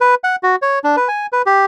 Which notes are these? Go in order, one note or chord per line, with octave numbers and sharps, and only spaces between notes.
B4
F#5
F#4
C#5
D4
B4
G#5
B4
G4